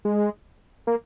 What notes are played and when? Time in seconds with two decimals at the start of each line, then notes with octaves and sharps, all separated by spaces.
0.05 G#3
0.87 A#3